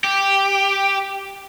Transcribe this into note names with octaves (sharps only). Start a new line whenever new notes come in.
G4